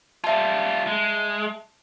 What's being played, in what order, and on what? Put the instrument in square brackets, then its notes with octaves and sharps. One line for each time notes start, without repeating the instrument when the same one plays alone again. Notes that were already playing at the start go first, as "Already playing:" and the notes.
[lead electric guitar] G3 F4 [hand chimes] E5 A5
[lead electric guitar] G#3